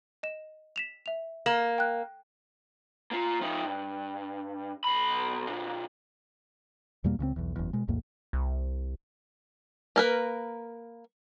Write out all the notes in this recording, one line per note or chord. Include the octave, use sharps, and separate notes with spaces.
D#5 E7
B6 E7 F7
E5 F7
A#3 E7 F#7
G5 F#6
A#3 F4
F3 D#4
G2
B1 B5
A#2 D3
E2 B2 G3 A#3
C#2 C#3 G3 C4
B1 E2
F#1 E2
B2 G#3
B1 E2 A2 A#3
C2
A#3 A#4 B4